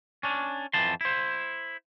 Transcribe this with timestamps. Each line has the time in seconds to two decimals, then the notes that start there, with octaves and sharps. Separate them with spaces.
0.23 C#4 D4
0.73 F2 E3 A5 C6
1.01 E4 C5